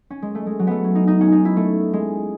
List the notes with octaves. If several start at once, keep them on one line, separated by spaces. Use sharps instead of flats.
C#4
G#3
A3
G#3
F#3
A3 B3
C#4
D#4
D#4
C#4
D#4
E4
A3
G#3